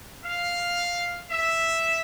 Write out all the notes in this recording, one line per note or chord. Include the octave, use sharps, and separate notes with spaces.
F5
E5